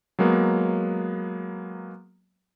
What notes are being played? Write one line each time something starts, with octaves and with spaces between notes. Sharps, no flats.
F#3 G#3 A#3 B3